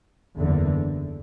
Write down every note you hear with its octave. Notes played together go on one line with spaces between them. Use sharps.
F#1 E2 D3